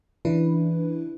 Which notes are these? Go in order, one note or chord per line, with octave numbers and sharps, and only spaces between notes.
C#3 E3 D4 E4 B4